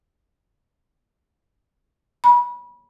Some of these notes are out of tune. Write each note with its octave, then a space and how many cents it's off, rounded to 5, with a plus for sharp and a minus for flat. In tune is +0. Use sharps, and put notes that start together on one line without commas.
B5 -25